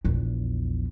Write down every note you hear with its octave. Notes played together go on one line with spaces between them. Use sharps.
A#1 E2